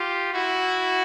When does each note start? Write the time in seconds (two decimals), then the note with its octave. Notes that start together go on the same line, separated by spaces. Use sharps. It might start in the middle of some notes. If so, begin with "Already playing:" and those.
Already playing: F4 G4
0.33 E4 F#4